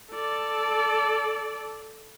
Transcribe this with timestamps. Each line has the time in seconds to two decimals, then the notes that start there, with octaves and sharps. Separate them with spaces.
0.11 A4 D5